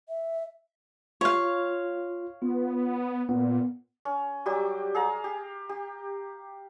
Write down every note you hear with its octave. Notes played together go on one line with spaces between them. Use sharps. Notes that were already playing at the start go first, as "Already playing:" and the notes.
E5
F4 C#5 F5
B3 F4
A#2 B3
C#4
F#3 G3 G4 D6
G#4 F5 A#5
G4
G4